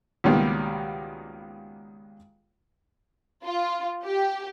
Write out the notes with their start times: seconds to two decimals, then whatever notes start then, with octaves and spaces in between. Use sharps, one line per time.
0.24 C#2 B2 D#3 G3 A#3 B3
3.45 F4
4.04 G4